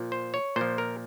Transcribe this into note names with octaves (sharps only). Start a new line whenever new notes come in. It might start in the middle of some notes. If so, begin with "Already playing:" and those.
Already playing: A#2 F3
C5
C#5
A#2 F3 C5
A#4